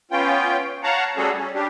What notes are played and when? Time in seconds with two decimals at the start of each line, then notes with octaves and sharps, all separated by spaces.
0.11 B3 C#4 F4 G5
0.83 C#5 F5 F#5 A5 A#5
1.17 G3 A3 C#4 F#4 G#4 A4
1.37 C#4
1.54 G3 D4 G4